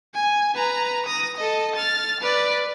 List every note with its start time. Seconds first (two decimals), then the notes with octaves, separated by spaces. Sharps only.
0.15 G#5
0.55 B4 A#5
1.06 D#6 A#6
1.37 A4 D#5
1.76 F6 A6
2.20 B4 D5